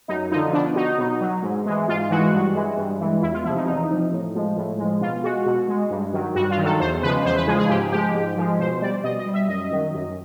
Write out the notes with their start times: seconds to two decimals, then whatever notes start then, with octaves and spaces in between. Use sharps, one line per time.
0.08 F#2 D#4
0.31 F3 D#4
0.35 D3
0.53 B2 D4
0.75 F#3 D#4
0.98 B2
1.21 F#3
1.43 G#2
1.65 E3 G#3
1.88 G#2 F4
2.10 E3 G#3 F#4
2.33 G2
2.55 E3 G#3
2.77 G2
3.00 E3 G#3
3.22 E2 E4
3.33 F4
3.44 C3 F3 E4
3.56 D#4
3.67 E2 D#4
3.89 C3 F3
4.11 A2
4.35 F3 G#3
4.56 A2
4.78 F3 G#3
5.01 B2 F4
5.24 G#3 F#4
5.46 B2
5.68 G#3
5.90 G2
6.13 D#3 F#3
6.35 G2 F#4
6.50 F4
6.58 D#3
6.63 F#3 A4
6.80 E2 C5
7.02 C#3 F3 G#3 B4
7.25 E2 C5
7.36 B4
7.47 C#3 F3 G#3 G#4
7.59 G#4
7.69 G#2 G4
7.92 F3 G#3 G4
8.15 G#2
8.37 F3 G#3
8.59 B2 C5
8.81 G3 D5
9.04 B2 D#5
9.19 D#5
9.26 G3
9.34 E5
9.49 F#2 D#5
9.71 D#3 F#3
9.94 F#2